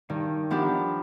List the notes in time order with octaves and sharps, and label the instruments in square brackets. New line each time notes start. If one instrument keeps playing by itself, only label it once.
[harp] G2 [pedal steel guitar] D#3
[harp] F3 B3 D4 G4